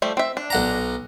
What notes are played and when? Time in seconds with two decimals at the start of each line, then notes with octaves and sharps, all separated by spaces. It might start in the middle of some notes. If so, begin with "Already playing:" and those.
0.02 F3 G3 A3
0.17 C4 E5
0.37 D4
0.50 B1 F#5 A#5